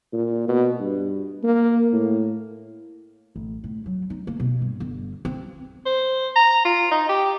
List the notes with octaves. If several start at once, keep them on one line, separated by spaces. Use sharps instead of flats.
A#2
B2
G2
A#3
A2
A1
A2
F#3
D#4
A#3
B2
G2
G1
C4
C5
A#5
F4
D#4
G4